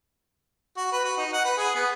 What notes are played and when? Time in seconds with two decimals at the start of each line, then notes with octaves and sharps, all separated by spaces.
0.77 F#4
0.92 B4
1.05 F#4
1.17 D#4
1.33 F#5
1.45 B4
1.58 G#4
1.75 B3